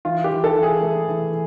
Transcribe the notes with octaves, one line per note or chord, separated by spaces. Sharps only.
E3 F4
G4
E3
A4
E3
G#4
A3
E3